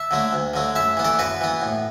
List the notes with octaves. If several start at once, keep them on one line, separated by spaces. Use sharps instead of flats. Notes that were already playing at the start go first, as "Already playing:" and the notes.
Already playing: E5 A5
D3 F#3 A3
D2
D3 F#3 A3
F#2 E5 A5
E3 B3
A4 D5
F#2 F#4 B4
E3 B3
A2